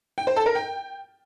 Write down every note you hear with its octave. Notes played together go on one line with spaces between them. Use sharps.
G5
C5
A4
A#4
G5